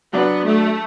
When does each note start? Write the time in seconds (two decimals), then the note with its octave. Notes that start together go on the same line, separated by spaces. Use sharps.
0.13 F#3 B3 D4 F#4
0.45 A3